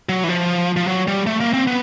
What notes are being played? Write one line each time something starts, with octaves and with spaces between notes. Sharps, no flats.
F#3
E3
F3
F3
F#3
G3
A3
A#3
C4
B3